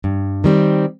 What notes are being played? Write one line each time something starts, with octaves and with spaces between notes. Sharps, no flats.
G2
D#3 G3 C4